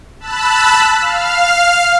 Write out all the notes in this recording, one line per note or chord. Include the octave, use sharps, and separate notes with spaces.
A5 B5 E6 F#6
F5 F6